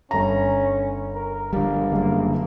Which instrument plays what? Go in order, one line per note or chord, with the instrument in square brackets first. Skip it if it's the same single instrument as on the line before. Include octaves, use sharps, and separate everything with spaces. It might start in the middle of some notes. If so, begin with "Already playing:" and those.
[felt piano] G1 A#5 [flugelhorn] C#4
[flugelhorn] A#4
[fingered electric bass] D3 G3 [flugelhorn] A#3
[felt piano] F#1